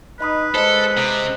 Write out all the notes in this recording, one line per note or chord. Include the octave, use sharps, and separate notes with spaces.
D#4 B4 D#5 B5 D#6
G#3 A4 C5 D#5
C3